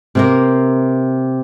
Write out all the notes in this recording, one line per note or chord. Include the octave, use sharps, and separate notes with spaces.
C3 A#3 A#4